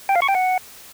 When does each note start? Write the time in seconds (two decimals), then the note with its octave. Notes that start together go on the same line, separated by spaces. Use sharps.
0.09 G5
0.16 F5
0.22 C#6
0.28 G5
0.35 F#5